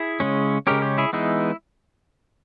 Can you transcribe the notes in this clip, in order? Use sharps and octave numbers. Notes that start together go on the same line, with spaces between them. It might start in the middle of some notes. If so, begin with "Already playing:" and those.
Already playing: E4 G#4
C#3 G#3 C#4
C#3 G#3 C#4 G4 A#4
G4
E4 G#4
E3 G#3 B3 D#4 E4 G#4